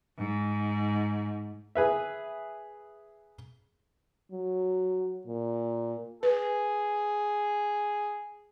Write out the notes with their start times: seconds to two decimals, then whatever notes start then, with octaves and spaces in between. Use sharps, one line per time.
0.17 G#2
1.75 G#4 B4 E5
4.32 F#3
5.27 A#2
6.23 G#4 B4